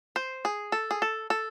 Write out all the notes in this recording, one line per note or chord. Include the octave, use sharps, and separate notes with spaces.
C5
G#4
A4
G#4
A4
A4